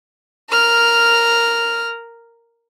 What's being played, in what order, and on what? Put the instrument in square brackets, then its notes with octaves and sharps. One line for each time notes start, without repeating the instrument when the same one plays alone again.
[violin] A#4 F6